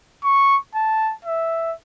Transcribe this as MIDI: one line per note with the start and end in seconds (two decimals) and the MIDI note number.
0.24 0.57 85
0.75 1.13 81
1.25 1.73 76